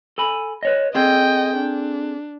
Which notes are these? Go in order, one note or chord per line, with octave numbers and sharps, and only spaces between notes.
A4 G#5 B5
B4 C#5 D#5
C4 G#4 A4 D#5 G5
D4